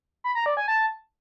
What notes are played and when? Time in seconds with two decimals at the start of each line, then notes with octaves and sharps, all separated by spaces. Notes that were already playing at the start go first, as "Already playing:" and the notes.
0.24 B5
0.35 A#5
0.46 D5
0.57 G#5
0.68 A5